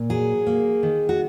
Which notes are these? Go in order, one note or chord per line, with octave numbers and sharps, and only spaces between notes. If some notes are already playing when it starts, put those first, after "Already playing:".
Already playing: A#2
F#3 G#4
A#3
D#3
F#4